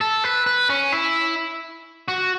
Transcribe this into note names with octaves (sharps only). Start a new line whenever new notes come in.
A4
B4
B4
C#4
E4
F#4